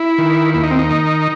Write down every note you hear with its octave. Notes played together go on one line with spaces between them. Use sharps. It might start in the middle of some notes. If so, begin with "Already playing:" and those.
Already playing: E4
D#3
D#2 E4
D#4
C4
D#4
D#3